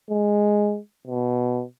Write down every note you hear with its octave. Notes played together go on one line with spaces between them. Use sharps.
G#3
B2